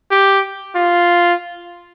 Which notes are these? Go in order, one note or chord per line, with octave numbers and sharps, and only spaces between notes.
G4
F4